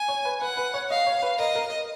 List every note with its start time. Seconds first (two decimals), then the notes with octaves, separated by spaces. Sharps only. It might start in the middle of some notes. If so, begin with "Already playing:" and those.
Already playing: G#5
0.08 C#5
0.25 B4
0.41 B4 F#5
0.57 B4
0.74 C#5
0.90 D#5 F5
1.07 C#5
1.22 B4
1.39 A#4 D#5
1.55 A#4